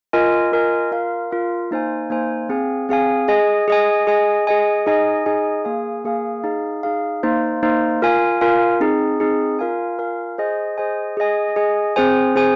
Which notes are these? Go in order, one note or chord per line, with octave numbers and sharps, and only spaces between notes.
F4 A#4 D#5 G#5
F4 A#4 D#5 G#5
F4 A#4 F5
F4 A#4 F5
A#3 D#4 C5 G#5
A#3 D#4 C5 G#5
C4 G#4 F5 G#5
C4 G#4 F5 G#5
G#4 D#5 G#5
G#4 D#5 G#5
G#4 D#5 G#5
G#4 D#5 G#5
D#4 G#4 D#5 G#5
D#4 G#4 D#5 G#5
A#3 G#4 F5 G#5
A#3 G#4 F5 G#5
D#4 G#4 F5
D#4 G#4 F5
A#3 D#4 C5
A#3 D#4 C5
F4 A#4 F5 G#5
F4 A#4 F5 G#5
C4 D#4 G#4
C4 D#4 G#4
F4 A#4 F5 G#5
F4 A#4 F5 G#5
G#4 C5 D#5 G#5
G#4 C5 D#5 G#5
G#4 D#5 G#5
G#4 D#5 G#5
C4 G#4 C5 G#5
C4 G#4 C5 G#5